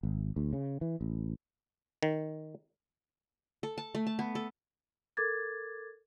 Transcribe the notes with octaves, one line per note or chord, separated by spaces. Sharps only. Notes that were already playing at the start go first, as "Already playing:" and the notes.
G#1
D2
C#3
E3
A1
D#3
A4
A5
A3
A5
B3
A4
A4 A#4 D6 G#6 A6